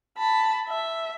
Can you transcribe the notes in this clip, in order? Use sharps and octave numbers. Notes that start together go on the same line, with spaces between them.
A5 B5
E5